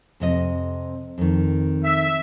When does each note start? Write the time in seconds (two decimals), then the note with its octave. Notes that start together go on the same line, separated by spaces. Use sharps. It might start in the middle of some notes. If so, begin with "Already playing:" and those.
0.20 F2 C3 D#5
1.18 F2 D#3
1.84 E5